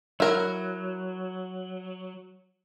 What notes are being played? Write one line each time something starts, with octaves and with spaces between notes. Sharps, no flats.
F#3 E4 A#4